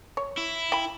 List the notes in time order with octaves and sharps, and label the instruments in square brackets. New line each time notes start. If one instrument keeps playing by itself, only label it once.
[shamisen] C#5
[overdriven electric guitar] E4
[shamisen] G5 B5